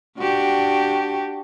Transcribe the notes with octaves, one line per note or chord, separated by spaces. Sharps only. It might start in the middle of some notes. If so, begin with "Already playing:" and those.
D4 F#4 G4